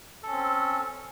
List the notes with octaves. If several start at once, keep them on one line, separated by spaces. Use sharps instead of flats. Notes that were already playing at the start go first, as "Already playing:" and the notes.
C4 C#4 A4